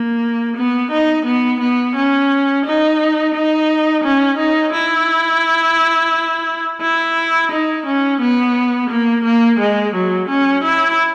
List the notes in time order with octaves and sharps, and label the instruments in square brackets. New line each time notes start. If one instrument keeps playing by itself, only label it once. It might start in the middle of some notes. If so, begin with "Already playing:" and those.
Already playing: [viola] A#3
B3
D#4
B3
B3
C#4
D#4
D#4
C#4
D#4
E4
E4
D#4
C#4
B3
A#3
A#3
G#3
F#3
C#4
E4